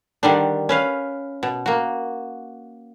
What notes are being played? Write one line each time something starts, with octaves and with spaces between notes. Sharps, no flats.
D3 D#3 G3 D4
C#4 B4 F5
B2
A#3 F#4